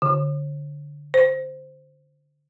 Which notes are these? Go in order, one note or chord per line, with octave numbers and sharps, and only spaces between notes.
D3
C5